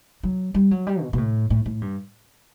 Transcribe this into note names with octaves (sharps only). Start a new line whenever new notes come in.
F#3
G3
F#3
G3
B2
B2
A2
A2
A2
G2